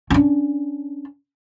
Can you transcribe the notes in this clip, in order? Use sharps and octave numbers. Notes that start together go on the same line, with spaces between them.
C#4 D4